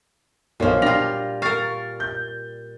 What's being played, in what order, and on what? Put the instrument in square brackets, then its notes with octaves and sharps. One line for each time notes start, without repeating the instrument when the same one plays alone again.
[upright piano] B1 C#5 [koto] A#2 F3
[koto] G3 F4 [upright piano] D4 A#6 F7
[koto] A#4 F5 [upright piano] C#6 A6
[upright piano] G6